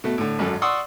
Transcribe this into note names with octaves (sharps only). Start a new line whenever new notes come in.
B2 A3
A2 D3
G#1 F#2 A4
D5 F#5 C6 C#6 D#6 E6